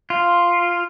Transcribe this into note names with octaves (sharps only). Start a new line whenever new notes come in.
F4